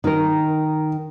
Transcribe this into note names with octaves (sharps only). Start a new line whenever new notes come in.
D#3 D#4 A#4